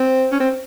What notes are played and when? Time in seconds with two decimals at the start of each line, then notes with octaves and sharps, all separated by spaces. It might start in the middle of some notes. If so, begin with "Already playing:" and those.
Already playing: C4
0.32 C#4
0.40 C4